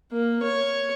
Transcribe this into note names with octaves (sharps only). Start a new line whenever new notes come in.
A#3
C#5